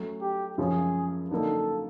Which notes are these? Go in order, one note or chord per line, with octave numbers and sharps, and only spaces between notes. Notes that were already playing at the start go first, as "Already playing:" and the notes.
Already playing: F#3 A3 C#4
G4
F#2 C#3 F3 G#3 C#4 G#4
D3 F#3 A#3 D#4 A4